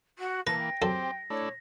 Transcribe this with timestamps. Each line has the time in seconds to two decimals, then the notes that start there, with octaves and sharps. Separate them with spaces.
0.18 F#4
0.47 E3 A#3 B4 A5 A#6
0.59 G5
0.82 F#2 C4 G4 A4 C5
1.30 A3 D4 E4 C#5